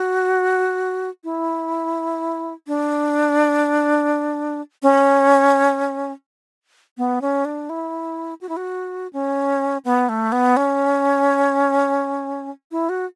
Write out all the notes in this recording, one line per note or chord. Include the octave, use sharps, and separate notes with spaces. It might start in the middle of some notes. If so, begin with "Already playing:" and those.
Already playing: F#4
E4
D4
C#4
B3
C#4
D4
E4
F#4
E4
F#4
C#4
B3
A3
B3
C#4
E4
F#4